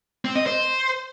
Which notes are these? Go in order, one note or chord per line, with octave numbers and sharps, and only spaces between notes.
C4
D#5
C5